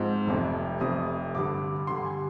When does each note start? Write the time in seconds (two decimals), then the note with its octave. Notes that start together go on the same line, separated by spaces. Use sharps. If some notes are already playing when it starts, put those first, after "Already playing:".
Already playing: G#2 F3 C4
0.27 F1 F2 C3
0.81 F1 F2 C3 D#6
1.35 G2 D3 G3 D6
1.87 G2 D3 G3 C6
2.05 G#5